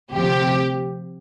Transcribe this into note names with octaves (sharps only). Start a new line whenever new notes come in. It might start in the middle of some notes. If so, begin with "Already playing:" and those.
D2 C3 F3 G4